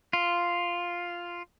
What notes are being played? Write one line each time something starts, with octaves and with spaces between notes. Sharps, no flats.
F4